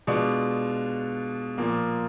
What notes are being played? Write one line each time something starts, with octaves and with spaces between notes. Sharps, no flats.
B2 G#3 D4 F4
A#2 F3 A#3